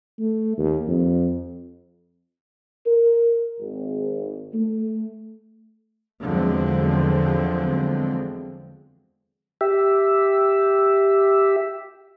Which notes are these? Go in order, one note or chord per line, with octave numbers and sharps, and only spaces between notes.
A3
D#2
F2
A#4
G#1
A3
E2 D3 F3 F#3 G#3 C4
G4 E5